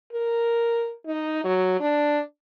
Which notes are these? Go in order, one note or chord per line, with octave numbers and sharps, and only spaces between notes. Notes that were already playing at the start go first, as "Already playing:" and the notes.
A#4
D#4
F#3
D4